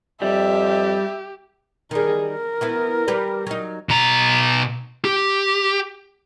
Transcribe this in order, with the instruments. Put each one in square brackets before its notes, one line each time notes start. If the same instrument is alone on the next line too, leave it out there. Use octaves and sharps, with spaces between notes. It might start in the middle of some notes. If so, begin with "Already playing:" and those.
[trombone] F2 [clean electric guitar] G3 [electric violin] G4 [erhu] E5
[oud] D#3 G3 [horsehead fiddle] G#4 A#4
[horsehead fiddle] A#4
[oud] B3 E4 F#4
G3 G4 B4
F#3 D#4
[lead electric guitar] B2 A#5
G4